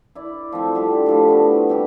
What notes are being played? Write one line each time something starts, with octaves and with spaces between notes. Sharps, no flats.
E4 D5
F3 A3 C4
D3 G3 G4
A2 F3 B5
A3 B3 F#4
G3 C4 D4 G4